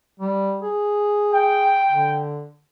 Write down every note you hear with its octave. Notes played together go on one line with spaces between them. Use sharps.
G3
G#4
G5
D3